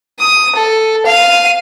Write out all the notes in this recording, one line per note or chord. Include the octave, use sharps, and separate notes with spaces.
D#6
A4
F5 D#7